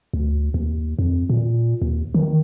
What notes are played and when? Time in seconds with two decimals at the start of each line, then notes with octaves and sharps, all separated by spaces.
0.14 D2
0.54 D#2
0.99 F2
1.30 A#2
1.82 D#2
2.14 D#3